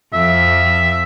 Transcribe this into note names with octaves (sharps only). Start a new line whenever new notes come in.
F2 E5